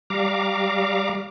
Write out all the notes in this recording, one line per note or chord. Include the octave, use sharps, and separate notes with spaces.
G3 F5 A#5 D6